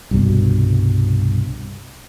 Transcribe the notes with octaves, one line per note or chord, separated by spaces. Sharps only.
C2 G2 B2